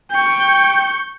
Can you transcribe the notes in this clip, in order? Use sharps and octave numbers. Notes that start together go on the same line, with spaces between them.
G5 C#6 G6